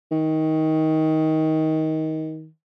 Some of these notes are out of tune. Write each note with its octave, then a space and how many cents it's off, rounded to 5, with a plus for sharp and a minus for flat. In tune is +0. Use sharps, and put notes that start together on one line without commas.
D#3 +20